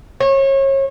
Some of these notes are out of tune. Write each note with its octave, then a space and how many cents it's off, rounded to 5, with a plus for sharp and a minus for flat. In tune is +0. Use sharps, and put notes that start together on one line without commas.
C#5 -30